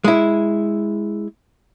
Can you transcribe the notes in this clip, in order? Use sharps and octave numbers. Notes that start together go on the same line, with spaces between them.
G#3 E4